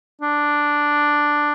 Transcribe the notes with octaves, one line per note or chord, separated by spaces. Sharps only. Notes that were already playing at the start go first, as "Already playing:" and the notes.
D4